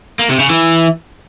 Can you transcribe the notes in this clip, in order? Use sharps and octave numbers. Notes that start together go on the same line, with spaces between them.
A#3
C3
C#3
E3